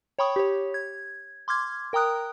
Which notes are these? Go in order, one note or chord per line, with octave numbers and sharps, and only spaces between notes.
C#5 G5 B5 C#6 D#6
G4 C#5
G#6
C6 D6 F6 G#6
A#4 G5 A#5 D#6 F#6